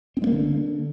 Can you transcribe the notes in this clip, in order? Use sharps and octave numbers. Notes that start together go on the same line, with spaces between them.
C4
G#3
A#3
D3